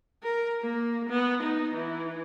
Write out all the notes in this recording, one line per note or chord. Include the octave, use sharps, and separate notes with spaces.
A#4
A#3
B3
D#4
E3